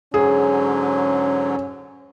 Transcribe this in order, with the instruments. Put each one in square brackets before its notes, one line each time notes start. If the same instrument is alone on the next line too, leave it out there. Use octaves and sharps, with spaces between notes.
[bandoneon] G#2 D3 F#3 [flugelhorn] C#4 [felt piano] G#4